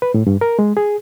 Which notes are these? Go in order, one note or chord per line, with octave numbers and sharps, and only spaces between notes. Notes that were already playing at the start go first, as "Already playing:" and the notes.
B4
A2
G2
A#4
G#3
G#4